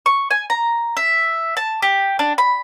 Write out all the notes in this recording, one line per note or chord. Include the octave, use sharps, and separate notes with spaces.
C#6
G#5
A#5
E5
A5
G4
D4
B5